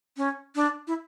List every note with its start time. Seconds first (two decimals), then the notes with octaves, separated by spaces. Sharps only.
0.17 C#4
0.55 D4
0.87 E4